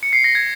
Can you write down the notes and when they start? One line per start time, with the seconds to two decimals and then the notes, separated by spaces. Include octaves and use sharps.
0.03 C#7
0.13 C7
0.24 A#6
0.35 G#6